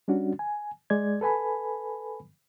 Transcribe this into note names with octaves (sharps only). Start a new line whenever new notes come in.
G3 C#4 D4 F#4
G#5
G#3 D5 G#6
A4 B4 G#5 B5